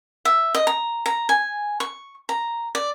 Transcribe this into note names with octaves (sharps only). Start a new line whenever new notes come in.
E5
D#5
A#5
A#5
G#5
C#6
A#5
D5